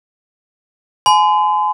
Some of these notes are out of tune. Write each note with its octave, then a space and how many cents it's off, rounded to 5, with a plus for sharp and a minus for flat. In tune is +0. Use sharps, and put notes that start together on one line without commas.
G#5 +30 C6 -40